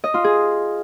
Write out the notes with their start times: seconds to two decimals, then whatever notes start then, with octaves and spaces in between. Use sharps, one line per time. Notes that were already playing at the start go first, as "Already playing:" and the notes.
0.04 D#5
0.14 F4
0.24 G#4